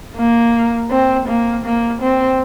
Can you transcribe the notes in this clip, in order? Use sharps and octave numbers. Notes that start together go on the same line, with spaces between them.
A#3
C4
A#3
A#3
C4